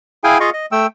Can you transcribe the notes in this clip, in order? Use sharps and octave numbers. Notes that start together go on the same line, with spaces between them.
E4 G#4 F5 G5 G#5
F4 G#4 D#5 F5 C#6
D#5
A3 G5 E6